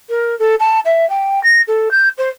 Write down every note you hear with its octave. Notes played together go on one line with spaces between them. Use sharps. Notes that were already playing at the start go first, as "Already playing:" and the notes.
A#4
A4
A5
E5
G5
A#6
A4
G6
C5